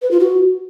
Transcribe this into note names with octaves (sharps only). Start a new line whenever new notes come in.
B4
F4
F#4